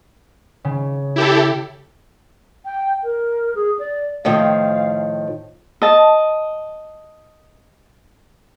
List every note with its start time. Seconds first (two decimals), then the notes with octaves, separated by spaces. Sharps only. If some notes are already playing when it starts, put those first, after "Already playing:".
0.65 C#3
1.16 E4 G4 A4
2.65 G5
3.04 A#4
3.55 G#4
3.79 D5
4.25 A2 D#3 F3 F5
5.82 D#5 A5